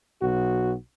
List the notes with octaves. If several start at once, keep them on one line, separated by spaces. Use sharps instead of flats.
B1 F#4